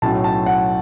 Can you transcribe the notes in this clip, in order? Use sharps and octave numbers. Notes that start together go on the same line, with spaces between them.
B1 A2 F#3 C#4 A5
A5
F#5